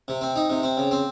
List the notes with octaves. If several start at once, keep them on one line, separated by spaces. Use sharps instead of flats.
C3
C4
D#4
C3
C4
C#3
C4